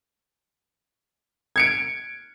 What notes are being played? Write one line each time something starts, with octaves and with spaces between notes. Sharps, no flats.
G#6 C#7 D7